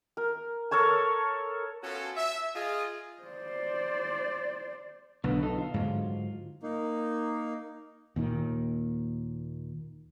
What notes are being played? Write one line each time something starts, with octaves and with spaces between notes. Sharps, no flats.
A#4
A4 A#4 C#5 A5
B3 C#4 F4 F#4 A4
E5
F4 G#4 D#5
C5 D5
B1 B2 D3 B3
D#4 A4
F4
G#2 D3 F#3
A#3 D#4
D#2 A#2 D#3